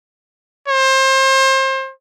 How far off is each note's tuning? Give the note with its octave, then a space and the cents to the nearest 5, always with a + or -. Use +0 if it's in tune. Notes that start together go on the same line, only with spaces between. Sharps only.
C5 +30